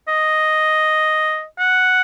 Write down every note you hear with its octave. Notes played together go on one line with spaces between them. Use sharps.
D#5
F#5